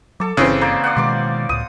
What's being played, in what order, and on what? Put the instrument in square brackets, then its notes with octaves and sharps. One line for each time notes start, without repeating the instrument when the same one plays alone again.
[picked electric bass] F#3 [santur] A4 D6
[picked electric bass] G1 [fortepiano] C#3 E3 C4
[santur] A#3 C5 D5
D5 F#5
[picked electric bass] B2 D#3 G#3 [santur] C6 D6
[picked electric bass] C#2 A2 [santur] D#6